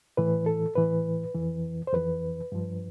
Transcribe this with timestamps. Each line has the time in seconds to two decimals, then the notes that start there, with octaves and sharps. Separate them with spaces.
0.17 A2 E3 B4
0.46 A4
0.75 A2 E3 B4
1.34 F2 E3
1.87 C5
1.93 F2 E3 B4
2.52 G2 F3